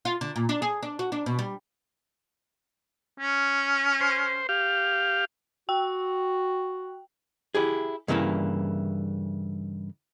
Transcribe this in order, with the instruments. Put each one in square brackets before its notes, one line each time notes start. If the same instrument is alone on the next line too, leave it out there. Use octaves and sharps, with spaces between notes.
[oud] F4
D3
A#2
D4
G#4
D4
F#4
D4
B2
G3
[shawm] C#4
[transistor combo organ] C5
G4 F5
[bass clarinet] F#4 [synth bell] G5
[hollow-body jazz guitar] E4 G4 G#4
G2 C#3 E3 A#3 E4